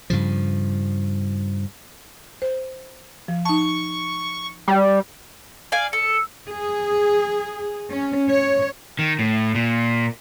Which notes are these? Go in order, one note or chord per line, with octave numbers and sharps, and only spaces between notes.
G2 C#3 F3
C5
F3
D#4 A5 C#6
G3
D5 F5 G#5
A4 C#7
G#4
C#4
C#5
D#3
A2
A#2